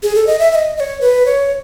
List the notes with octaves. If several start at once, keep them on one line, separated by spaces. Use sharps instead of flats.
G#4
A4
D#5
E5
E5
D#5
D#5
C#5
B4
C#5